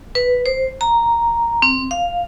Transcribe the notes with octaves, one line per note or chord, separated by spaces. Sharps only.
B4
C5
A#5
C4
F5